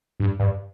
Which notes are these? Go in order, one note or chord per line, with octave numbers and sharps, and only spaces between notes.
G2
G2